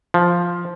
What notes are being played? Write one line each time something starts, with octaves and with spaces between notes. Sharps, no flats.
F3